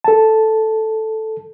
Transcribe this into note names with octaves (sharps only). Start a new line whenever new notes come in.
A4 A5